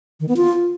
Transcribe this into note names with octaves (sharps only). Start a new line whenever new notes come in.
D#3
B3
F4